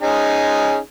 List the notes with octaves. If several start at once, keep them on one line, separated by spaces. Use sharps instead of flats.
C#4 D#4 G#4